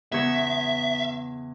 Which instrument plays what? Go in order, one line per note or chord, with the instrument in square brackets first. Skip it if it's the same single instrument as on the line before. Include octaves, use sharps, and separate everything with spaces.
[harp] E2 C#3 C#5 [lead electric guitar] E5